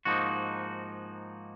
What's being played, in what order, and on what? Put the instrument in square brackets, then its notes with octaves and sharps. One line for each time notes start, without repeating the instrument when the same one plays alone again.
[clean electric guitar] G#2 F3 A#3 D#4 F#4